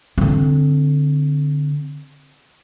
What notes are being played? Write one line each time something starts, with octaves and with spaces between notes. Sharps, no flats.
D3 C4